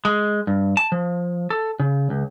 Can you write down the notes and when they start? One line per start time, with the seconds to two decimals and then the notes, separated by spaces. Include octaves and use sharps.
0.05 G#3
0.47 G2
0.77 A5
0.92 F3
1.50 A4
1.80 C#3
2.10 C#2